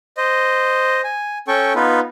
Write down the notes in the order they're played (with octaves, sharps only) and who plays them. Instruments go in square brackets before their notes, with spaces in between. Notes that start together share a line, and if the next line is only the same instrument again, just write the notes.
[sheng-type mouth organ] C5 D#5
G#5
C#4 A4 G5 C#6
B3 D#4 F4 B4